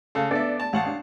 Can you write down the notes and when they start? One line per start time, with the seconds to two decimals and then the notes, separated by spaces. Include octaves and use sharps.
0.15 C#3 A4 F5
0.31 B3 D4 A4 D5 E5
0.60 A5
0.73 A1 F5 F#5 A5
0.86 D4